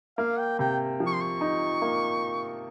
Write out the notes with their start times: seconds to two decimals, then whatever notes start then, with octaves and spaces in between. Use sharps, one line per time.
0.18 A#3 F5
0.39 G5
0.59 C3 G5
1.00 F3
1.07 C#6
1.13 C6
1.21 C#6
1.41 D#4
1.82 A#3